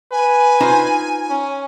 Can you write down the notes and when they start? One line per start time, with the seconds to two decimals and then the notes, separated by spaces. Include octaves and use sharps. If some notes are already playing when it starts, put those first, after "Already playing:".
0.12 B4 G#5
0.60 D#4 F4 C5
1.30 C#4